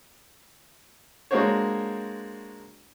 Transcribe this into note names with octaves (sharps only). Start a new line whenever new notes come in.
G#3 A#3 D4 F#4 C5 C#5